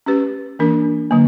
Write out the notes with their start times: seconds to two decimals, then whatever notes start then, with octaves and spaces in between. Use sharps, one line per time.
0.06 C#4 G4 B4
0.59 E3 A#3 D4 A#4
1.11 D3 F#3 A#3